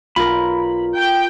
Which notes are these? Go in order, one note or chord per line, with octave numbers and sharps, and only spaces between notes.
B1 F4 A#4 B5
G5